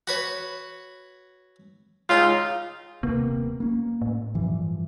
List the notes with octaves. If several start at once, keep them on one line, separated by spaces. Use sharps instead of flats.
F#4 B4 C#5
C#2 C#3 D#4 F4
D#1 C3 A#3 B3
A#3 C#4
A2
G2 E3 F3